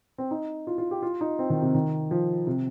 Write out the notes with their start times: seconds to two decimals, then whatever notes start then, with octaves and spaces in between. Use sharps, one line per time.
0.18 C4
0.31 D#4
0.67 F4
0.78 F4
0.91 G4
1.02 F4
1.21 D#4
1.39 C4
1.50 D#3
1.62 C3
1.74 D#3
2.11 F3
2.47 C3